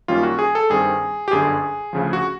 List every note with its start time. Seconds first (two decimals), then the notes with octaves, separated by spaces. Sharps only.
0.08 F#2 D#3 G3 A#3 C#4 F4
0.23 F#4
0.39 G#4
0.55 A4
0.70 G2 D#3 G3 C4 G#4
1.28 G4
1.31 G1 F#2 D3 G#4
1.93 D2 C#3 F3
2.13 F#4